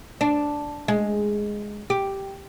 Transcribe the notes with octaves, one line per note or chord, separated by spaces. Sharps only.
D4
G#3
G4